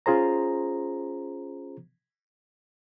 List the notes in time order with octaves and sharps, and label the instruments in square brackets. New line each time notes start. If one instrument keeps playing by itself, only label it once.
[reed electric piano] C#4 F4 G#4 C5 A#5